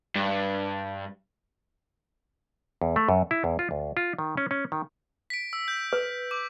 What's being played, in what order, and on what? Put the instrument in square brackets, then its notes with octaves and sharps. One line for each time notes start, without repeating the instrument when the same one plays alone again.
[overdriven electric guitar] G2
[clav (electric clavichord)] E2
A3
F#2
E4
E2
F4
D2
F4
D#3
C#4
C#4
D#3
[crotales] B6 D7
E6
G6
[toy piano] B4
[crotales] D6